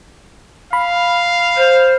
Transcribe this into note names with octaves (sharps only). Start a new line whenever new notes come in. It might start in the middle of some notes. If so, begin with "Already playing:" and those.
F5 B5
C5